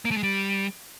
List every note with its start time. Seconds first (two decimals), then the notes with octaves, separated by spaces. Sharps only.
0.05 A#3
0.11 A3
0.17 G#3
0.23 G3